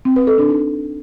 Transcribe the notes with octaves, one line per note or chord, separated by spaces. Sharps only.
C4
B4
A4
D4
D#4